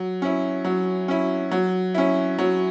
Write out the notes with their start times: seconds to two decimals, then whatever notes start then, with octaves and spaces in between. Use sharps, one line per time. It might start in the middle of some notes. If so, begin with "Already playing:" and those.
Already playing: F#3
0.22 C#4 E4
0.65 F#3
1.08 C#4 E4
1.51 F#3
1.95 C#4 E4
2.39 F#3